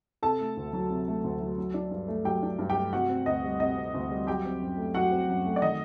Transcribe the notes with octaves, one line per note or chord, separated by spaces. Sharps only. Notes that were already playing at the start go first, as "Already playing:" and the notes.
C3 A4 A5
A3
D2
F#3
C3
A3
D2
F#3
F#3
D4
G2
A3
F#3 G4 G5
D4
G2
G4 G5
A3
C3 F#4 F#5
C4
D2 D#5
G3
C3 D#5
C4
D2
G3
F#3 G4 G5
C4
F#2
A3
F#3 F#4 F#5
C4
F#2
A3
D5
D#3 D#5